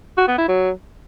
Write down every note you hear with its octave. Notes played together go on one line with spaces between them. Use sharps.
F#4
B3
E4
F#3